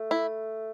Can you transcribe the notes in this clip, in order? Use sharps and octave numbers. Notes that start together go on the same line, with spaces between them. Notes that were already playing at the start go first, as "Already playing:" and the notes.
Already playing: A3
E4